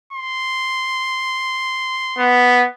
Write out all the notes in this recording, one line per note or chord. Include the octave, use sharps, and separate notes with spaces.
C6
B3